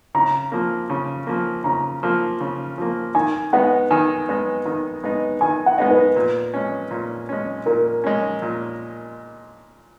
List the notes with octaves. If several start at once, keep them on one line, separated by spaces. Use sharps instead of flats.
C#3 A#5
F3 A#3
C#3
F3 A#3
C#3 A#5
F3 A#3
C#3
F3 A#3
D#3 G#5
G#3 B3 D#4 F#5
D#3 G#5
G#3 B3 D#4
D#3
G#3 B3 D#4
D#3 G#5
F#5
G#3 B3 D#4
B4
A#2
G#3 C#4
A#2
G#3 C#4
A#2 A#4
G#3 C#4
A#2